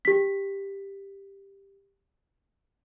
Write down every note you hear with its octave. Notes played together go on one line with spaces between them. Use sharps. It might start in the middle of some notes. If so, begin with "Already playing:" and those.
G4 B6